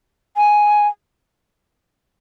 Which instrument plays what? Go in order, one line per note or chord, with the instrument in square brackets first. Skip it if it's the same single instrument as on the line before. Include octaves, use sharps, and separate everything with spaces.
[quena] G#5